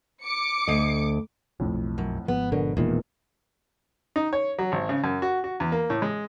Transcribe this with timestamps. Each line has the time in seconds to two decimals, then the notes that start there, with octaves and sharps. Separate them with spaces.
0.22 D6 C#7
0.67 D2 D#5
1.60 E1 B1 F2 A2
1.73 B1
1.98 F#2
2.28 G#1 G#2 F3 B3
2.52 B2 D3 A#4
2.77 E1 E2 A#2 D#3
4.16 D#4
4.33 C#5
4.59 F#3
4.72 G#1
4.89 C#3
5.04 F#2
5.22 F#4
5.44 F#4
5.60 E2
5.72 A#3
5.90 A2
6.02 G#3